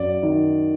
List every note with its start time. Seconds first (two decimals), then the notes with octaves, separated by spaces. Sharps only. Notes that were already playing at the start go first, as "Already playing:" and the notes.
Already playing: F#2 D5
0.23 D#3